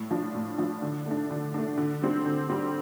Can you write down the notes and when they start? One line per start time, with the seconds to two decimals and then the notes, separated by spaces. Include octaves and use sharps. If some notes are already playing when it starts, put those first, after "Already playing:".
Already playing: A2
0.11 F3 D4
0.35 A2
0.58 F3 D4
0.82 D3
1.06 A3 D4
1.31 D3
1.54 A3 D4
1.78 D3
2.02 G3 C4
2.26 D3
2.50 G3 C4